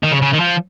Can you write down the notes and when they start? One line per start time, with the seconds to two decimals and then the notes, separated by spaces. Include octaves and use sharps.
0.03 D#3
0.12 C#3
0.22 C#3
0.33 D#3
0.40 F3